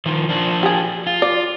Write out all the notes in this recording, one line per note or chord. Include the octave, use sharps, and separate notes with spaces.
D#3 F3
F3 D4
G4 G#4
F4
D5